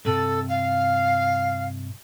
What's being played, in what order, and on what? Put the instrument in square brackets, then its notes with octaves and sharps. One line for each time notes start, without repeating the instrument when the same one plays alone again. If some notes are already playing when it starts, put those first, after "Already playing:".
[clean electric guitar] G2 C3 [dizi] A4
[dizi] F5